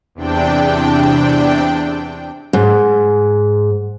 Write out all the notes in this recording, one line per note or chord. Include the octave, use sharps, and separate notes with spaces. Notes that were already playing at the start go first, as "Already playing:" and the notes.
E2 C3 D4 G5
G#2